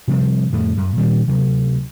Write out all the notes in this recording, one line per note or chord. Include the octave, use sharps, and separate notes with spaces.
C3 F3 G3 C4
F2 A2 D3 A3
F#2
A#2 D#3 G3 C4
D2 C3 F#3